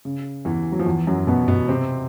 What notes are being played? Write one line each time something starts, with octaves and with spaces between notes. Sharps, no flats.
C#3
E2 E3
F#3
F3
E2 E3
F#2 F#3
B2 B3
B2 B3
C3 C4